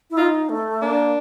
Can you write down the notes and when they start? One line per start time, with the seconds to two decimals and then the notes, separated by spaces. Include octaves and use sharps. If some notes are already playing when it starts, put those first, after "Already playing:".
0.10 E4
0.17 D#4 F4
0.49 A3
0.82 A#3 D4